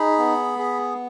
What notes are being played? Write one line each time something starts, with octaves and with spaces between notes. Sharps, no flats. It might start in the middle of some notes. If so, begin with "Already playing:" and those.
Already playing: D#4 G#4 B5
B3
G#4